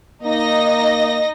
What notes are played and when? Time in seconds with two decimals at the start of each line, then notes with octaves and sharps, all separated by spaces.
0.23 A#3 D#4 D#5 A#6